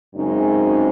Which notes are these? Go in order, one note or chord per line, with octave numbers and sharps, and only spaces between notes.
F#2 C#3 G#3 C4 D#4